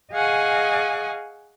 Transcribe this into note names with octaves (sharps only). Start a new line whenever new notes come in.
G#4 D#5 F5 F#5 G#5 C#6